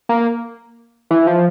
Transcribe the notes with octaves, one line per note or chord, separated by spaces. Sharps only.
A#3
E3
F3